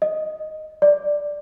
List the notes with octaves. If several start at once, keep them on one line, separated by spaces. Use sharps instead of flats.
D#5
D5